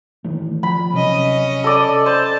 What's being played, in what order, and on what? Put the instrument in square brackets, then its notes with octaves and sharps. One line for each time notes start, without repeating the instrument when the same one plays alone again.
[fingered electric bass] D#3 E3 A3
[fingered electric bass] F3 [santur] B5
[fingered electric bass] C3 F#3 [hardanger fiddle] C#4 D#5
[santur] A4 D5
[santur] C5 [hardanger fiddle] A5